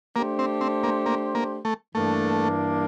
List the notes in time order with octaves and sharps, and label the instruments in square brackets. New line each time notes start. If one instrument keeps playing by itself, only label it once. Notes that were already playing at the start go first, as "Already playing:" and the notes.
[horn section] A3 D4 G4 C5 [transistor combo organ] A#3
[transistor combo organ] C4
C4
A#3
A#3
A#3
A3
[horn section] G2 E3 A#3 D4 [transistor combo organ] A3